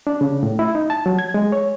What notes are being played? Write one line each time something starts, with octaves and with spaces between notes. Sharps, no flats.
D4
C#3
A2
E4
D#4
A5
F#3
G#6
G#3
C#5